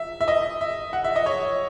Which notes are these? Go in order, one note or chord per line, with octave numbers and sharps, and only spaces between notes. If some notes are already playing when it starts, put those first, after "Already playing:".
Already playing: E5
E5
D#5
E5
F#5
E5
D#5
C#5